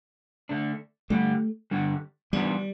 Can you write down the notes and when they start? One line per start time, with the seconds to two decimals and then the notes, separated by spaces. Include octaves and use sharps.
0.49 D3 A3 D4
1.10 D3 G3 A3 D4 G4
1.71 D3 G3 D4 A4
2.33 E3 G3 B3 D4 G4 B4